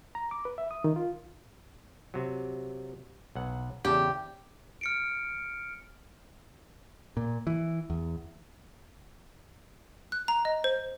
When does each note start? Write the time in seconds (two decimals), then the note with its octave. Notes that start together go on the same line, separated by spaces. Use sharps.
0.15 A#5
0.31 D6
0.45 B4
0.58 E5
0.71 D#6
0.84 D#3
0.96 F4
2.14 C3 F#3
3.35 B1 F#5
3.85 E2 C#3 G4 A5
4.81 F6 C#7 D7
7.17 A#2
7.47 E3
7.90 E2
10.12 F#6
10.28 A#5
10.45 D#5
10.64 C5